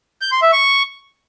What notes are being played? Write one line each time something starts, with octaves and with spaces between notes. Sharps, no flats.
G6
C6
E5
C#6